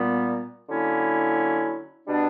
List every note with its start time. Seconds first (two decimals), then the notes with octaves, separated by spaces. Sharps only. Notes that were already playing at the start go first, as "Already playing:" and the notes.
Already playing: A#2 G3 B3
0.68 D3 F#3 A#3 C#4 E4
2.07 B2 G3 B3 D4